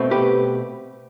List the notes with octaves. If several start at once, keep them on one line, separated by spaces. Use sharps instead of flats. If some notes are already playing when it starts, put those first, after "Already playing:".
Already playing: B2 A3 C4
G4 B4